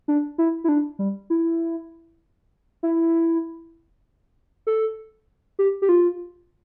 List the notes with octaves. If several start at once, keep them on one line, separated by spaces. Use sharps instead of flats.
D4
E4
E4
D4
G3
E4
E4
A4
G4
G4
F4